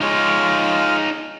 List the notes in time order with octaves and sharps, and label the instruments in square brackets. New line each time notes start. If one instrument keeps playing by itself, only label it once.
[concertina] G#3 F4 F5 [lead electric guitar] D#4 C#5